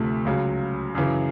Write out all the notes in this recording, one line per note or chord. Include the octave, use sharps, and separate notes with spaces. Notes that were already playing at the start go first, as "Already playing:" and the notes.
Already playing: D2 C3 F3 A3
C#2 C#3 F#3
F#2 C#3 E3